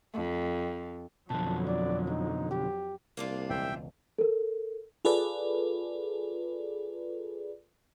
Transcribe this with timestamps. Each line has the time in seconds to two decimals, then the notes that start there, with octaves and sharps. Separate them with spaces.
0.14 F2
1.30 F2 B2 D3 F3 F#3 A5
1.67 D5
2.10 D#4
2.51 G4
3.17 C2 A#3 D4 F4
3.50 E1 C#2 E5 G5
4.18 A4 A#4
5.05 F4 G#4 A4 B4 D5